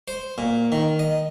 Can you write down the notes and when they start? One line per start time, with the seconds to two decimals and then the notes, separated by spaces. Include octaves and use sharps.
0.08 C5
0.38 A#2
0.72 D#3
0.99 D#5